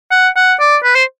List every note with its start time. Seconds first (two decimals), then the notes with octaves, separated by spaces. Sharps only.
0.11 F#5
0.36 F#5
0.60 D5
0.84 B4
0.95 C5